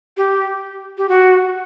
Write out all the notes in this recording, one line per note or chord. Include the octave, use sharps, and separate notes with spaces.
G4
G4
F#4